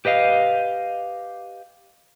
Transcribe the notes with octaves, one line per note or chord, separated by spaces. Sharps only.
G4 B4 D#5 F5